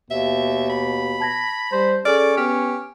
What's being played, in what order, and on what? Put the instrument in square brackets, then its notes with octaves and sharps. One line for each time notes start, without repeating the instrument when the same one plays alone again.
[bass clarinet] D#2 [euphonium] B2 [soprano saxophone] E5
[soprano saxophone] B5
[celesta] A5 G#6 A#6
[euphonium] G3 [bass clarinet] C5
[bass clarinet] C#4 [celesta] G#4 F6 [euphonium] A4 [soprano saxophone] D5
[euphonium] B3 [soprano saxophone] G4 [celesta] F6